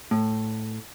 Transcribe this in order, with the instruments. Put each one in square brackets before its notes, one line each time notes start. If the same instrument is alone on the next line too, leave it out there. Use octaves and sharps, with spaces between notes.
[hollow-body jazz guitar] A2